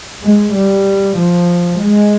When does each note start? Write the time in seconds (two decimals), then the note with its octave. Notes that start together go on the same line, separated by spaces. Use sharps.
0.23 G#3
0.55 G3
1.18 F3
1.80 G#3